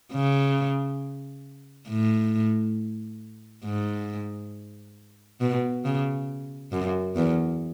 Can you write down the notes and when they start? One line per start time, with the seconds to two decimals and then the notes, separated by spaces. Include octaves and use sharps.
0.13 C#3
1.89 A2
3.64 G#2
5.41 B2
5.85 C#3
6.72 F#2
7.16 E2